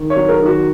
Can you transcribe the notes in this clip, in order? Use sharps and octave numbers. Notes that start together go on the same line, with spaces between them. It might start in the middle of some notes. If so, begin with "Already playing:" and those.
Already playing: D#3
C#5
F#3
A#4
D#3
F#4